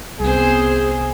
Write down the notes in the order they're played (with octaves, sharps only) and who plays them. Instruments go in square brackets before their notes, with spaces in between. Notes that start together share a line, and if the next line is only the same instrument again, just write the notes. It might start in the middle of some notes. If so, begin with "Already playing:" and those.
[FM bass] C2 [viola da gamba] B3 C4 C5 [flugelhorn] G#4